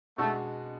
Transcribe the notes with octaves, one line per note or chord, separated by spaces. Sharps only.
B2 G#3 A3 D4 F#4